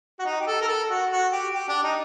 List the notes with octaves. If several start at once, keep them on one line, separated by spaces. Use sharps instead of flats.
F#4
D#4
G4
A4
A#4
A4
F#4
F#4
G4
G4
D4
D#4